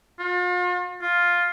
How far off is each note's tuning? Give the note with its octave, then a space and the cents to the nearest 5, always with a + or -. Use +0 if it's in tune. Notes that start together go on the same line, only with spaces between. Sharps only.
F4 +40
F4 +5